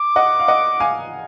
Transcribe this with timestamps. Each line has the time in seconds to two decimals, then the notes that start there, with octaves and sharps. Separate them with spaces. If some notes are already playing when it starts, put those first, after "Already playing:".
Already playing: D6
0.16 D#5 F#5
0.40 F5
0.48 D#5 F#5
0.80 F5 G#5